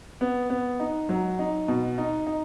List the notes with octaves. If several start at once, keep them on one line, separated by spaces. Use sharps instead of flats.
B3
B3
D#4
F#3
D#4
B2
D#4
D#4